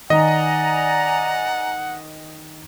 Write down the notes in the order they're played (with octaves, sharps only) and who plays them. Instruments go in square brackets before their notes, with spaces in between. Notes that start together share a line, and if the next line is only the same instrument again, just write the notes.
[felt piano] D#3 [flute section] D5 G#5 A#5 [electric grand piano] D#5 [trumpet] F#5